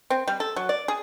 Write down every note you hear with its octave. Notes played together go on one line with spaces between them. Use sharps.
C4
G3
A4
F#3
D5
G#4